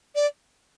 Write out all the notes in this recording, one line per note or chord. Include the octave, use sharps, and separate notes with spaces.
D5